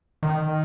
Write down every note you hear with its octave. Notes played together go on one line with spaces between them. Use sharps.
D#3